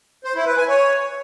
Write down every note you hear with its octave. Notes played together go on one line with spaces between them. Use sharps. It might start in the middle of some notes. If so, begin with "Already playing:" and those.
C5
E4
B4
G#5
C#5